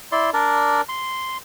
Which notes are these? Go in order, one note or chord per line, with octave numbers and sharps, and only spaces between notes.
E4 D5 C6
D4 A#4 D5
C6